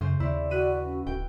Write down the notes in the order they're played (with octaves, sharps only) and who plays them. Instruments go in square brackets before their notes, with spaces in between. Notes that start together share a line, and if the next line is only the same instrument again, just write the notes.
[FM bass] F#2 [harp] C#3 C5
[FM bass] D#2 [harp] C4 E4 [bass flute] D5
[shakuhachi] F#4 [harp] B4 D#7
[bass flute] C#4
[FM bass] D1 [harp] G5